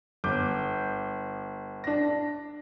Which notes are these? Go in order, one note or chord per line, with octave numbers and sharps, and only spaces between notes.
G1 D6 G6
D4 A#6